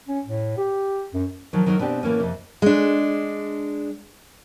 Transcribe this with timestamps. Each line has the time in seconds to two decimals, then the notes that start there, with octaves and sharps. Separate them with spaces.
0.08 C#4
0.26 A2
0.57 G4
1.14 F#2
1.53 D#3 F3 F#3
1.66 D#3 F#3 D#4 F#4 A#4
1.79 B2 C4 D4 G4
2.03 A2 E3 A#3 C#4
2.20 F2 C3
2.62 G#3 D4